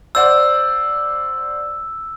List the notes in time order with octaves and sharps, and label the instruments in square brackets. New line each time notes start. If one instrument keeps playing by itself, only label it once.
[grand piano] C5 D5 F#5 [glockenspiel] E6